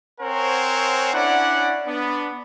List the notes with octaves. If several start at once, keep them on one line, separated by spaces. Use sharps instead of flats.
C4 A#4 C5 C#5 F#5 G#5
C#4 D4 E4 D5 F#5
B3 D4